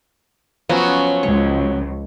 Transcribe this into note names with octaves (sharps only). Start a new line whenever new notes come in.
F3 F#3 B3 C#4
C#2 C#5